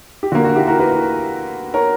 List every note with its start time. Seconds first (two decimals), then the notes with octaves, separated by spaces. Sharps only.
0.23 G4
0.32 D3 A#3 F#4
0.44 F#4
0.56 E4 G4
0.67 F#4 A#4
0.79 G4 B4
1.74 A#4 C#5